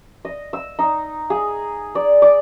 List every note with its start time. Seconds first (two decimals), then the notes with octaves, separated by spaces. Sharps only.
0.25 D#5
0.53 E6
0.79 D#4
1.30 G#4
1.95 D5
2.22 D5